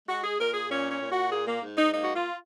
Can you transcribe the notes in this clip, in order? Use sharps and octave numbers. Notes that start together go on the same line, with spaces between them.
G#3 F#4
G#4
A#2 A#4
G#4
A#2 C#4
C#4
A#2
F#4
A#3 G#4
A#3
G#2
D#4
A#3 D#4
F#4
F4